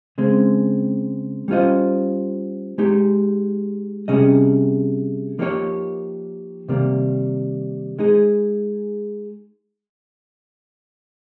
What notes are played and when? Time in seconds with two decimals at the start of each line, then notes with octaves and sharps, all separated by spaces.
0.18 C#3 G#3 C4
1.48 G3 C#4 F4 C5 D#5
2.78 G#3 D#4 G4
4.08 C3 G3 C#4 G#4 D#5
5.39 F3 A#3 D#4 G4 C#5
6.69 C3 D#3 G3 A#3
7.99 G#3 D#4 G#4